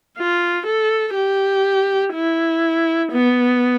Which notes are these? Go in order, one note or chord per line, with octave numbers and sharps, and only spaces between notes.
F4
A4
G4
E4
B3